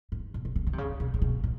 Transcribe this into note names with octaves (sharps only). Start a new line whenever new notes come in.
A2
A#2
C3
C#3
D3
C3
C#3
B2
A#2
B2
A#2